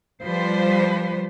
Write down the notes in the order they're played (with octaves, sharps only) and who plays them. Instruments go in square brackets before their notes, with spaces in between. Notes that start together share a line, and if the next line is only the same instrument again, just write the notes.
[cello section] F3 G3 B4 C5